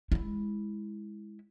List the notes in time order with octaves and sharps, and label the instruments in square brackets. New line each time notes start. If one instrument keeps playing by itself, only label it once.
[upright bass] G#3 E4